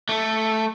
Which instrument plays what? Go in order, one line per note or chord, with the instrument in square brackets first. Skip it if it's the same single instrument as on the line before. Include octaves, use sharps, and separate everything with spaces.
[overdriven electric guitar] A3